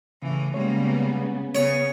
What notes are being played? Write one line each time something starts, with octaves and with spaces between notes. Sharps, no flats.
A2 C#3 E3
C#3 G3 G#3 A#3 B3 C#5
C#3 B3 C#5